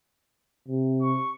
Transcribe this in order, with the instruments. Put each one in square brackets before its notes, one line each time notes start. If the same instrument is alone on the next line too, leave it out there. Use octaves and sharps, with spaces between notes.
[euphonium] C3
[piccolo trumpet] C#6